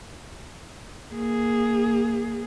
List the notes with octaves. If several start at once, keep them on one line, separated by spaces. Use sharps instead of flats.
A#3 G#4